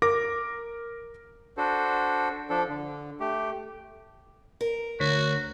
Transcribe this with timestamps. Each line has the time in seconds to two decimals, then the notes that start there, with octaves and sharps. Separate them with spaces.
0.02 A#4 D6 A#6
1.57 D4 F#4 A4 C5
2.50 F3 D4 A4
2.68 D3
3.20 A3 G4
4.61 A#4
5.00 D2 F#4 C#5 B6